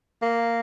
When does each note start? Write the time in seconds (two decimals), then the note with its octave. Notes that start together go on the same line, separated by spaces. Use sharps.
0.22 A#3